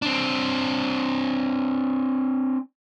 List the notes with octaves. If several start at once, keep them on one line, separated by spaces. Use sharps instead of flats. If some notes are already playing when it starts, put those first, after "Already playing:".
C4 D4